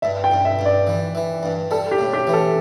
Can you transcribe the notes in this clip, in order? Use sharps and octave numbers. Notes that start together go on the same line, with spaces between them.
G2 E5
G5
G2
E5
G2
D5
E3
E3
G2
G3 A4
G4
A2
G4
E3
A4